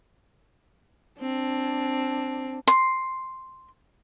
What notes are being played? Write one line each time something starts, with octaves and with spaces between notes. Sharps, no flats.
C4 D4
C6